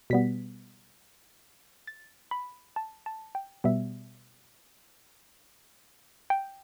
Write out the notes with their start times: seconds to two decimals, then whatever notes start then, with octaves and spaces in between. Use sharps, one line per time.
0.10 B2 G3 B3 B6
1.87 A6
2.31 B5
2.76 A5
3.06 A5
3.35 G5
3.64 B2 G3 B3 E5
6.30 G5